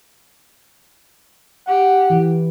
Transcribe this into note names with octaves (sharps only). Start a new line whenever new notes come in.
G4 F#5
E3